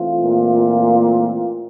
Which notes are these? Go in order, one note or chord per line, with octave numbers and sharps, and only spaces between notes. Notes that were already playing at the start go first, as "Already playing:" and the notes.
Already playing: E3 A3 C4 F4
A#2